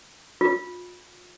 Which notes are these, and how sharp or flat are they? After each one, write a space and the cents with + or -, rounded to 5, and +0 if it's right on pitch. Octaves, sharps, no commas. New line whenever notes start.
F4 +30